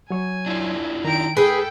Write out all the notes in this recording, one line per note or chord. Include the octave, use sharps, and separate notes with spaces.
F#3 C#5 G#5
D4 E4 F4
D#3 G5 A#5 D7
G#2 G#4 A4 B4 G5